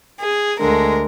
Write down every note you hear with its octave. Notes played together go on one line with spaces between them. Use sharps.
G#4
D2 D3 G#3 A#4